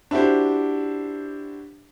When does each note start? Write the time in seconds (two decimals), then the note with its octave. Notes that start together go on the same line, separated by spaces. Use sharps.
0.11 D4 E4 F#4 G4 C5